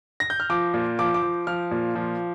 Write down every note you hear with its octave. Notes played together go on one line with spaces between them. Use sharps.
A#6
G6
F6
F3 D6
A#2
F3 D6
D6
F3
F3 F6
A#2
F3